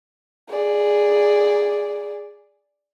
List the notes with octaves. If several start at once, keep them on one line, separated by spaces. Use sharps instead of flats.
G#4 D5